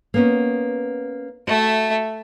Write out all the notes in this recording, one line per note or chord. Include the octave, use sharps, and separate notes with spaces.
A#3 B3 C#4
A3 F#4 E5